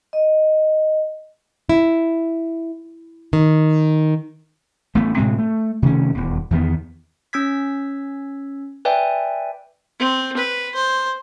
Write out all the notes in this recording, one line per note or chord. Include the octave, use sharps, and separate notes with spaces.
D#5
E4
D#3
A1 A3 B3
A2 C3 G#3 C4
A3
C3 D#3 A3 C#4
D#1 E2
E2 D#3 B3
C#4 E6 G#6 B6
B4 D5 E5 G5 G#5
C4
B4
C5